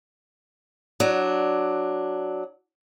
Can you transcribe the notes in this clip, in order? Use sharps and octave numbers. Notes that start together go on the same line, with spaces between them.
F#3 D4